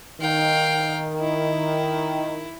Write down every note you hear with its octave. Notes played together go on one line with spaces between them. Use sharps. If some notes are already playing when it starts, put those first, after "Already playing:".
D#3 F5 G5
E4